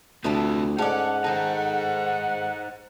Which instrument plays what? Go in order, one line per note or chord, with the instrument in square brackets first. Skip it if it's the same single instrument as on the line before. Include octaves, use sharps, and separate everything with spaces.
[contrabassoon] D2 [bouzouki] B3 E4 A5 [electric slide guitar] C4 F4 G4
[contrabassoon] G#2 [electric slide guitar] C#4 [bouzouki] A4 D5 [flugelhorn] F#5
[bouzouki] D#3 A4 [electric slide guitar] D#4 C5